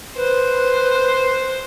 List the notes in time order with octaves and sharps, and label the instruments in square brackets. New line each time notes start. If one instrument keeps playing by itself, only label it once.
[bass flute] B4 [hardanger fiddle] C5